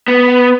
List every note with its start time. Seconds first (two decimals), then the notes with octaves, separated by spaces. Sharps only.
0.08 B3